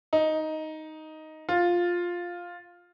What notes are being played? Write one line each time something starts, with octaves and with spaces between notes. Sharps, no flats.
D#4
F4